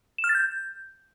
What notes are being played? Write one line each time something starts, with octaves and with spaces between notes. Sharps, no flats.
E7
F6
A6
G6